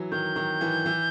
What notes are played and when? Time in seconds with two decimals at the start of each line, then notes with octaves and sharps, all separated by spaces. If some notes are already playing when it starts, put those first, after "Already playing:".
Already playing: E3 F#3
0.12 D#3 G6
0.36 D#3
0.61 E3
0.86 E3